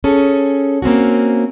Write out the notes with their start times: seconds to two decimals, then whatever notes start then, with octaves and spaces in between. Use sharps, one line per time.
0.04 C#4 G#4 A4
0.82 A#3 C4 C#4 F#4